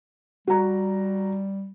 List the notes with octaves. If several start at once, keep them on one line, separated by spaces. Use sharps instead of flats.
G3 F#4 A#5